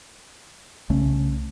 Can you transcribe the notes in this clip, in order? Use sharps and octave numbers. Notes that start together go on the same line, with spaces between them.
C2 C#3 A3 C#4